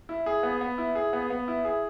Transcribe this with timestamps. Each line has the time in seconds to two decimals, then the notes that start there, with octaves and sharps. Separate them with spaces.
0.09 E4
0.26 G#4
0.43 B3
0.61 B3
0.78 E4
0.95 G#4
1.13 B3
1.30 B3
1.48 E4
1.65 G#4